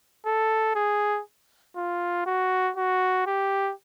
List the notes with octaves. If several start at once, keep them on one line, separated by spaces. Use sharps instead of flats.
A4
G#4
F4
F#4
F#4
G4